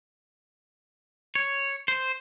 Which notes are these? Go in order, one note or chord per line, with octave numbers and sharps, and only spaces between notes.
C#5
C5